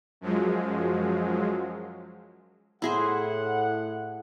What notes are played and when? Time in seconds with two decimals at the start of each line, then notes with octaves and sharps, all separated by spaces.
0.21 F#2 F3 F#3 G#3
2.82 A2 E4 G#4 C5 F#5